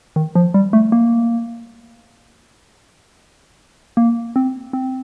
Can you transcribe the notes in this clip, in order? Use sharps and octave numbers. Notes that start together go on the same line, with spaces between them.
D#3
F3
G3
A3
A#3
A#3
C4
C4